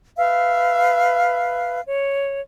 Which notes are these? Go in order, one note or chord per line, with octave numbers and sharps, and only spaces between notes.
B4 E5 F5
C#5